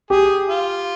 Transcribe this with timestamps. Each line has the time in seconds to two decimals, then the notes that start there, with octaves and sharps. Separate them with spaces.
0.10 G4 G#4
0.49 F4